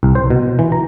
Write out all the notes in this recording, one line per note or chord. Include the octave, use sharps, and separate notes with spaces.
C2
C5
B2
E3
A#5